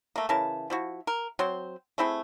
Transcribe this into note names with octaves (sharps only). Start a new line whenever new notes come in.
A3 A#3
C#3 E3 A#4 A5
F3 E4 F#4
A#4
F#3 C4 C5
A3 C4 E4 G#4